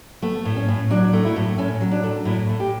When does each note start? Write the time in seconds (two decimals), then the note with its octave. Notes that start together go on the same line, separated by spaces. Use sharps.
0.22 A3 B3
0.45 A2
0.56 C#4
0.68 A2
0.90 F#3 D4
1.13 A3
1.25 E4
1.36 A2
1.58 A2 C#4
1.81 F#3
1.91 D4
2.03 A3
2.25 A2 E4
2.49 A2
2.60 G4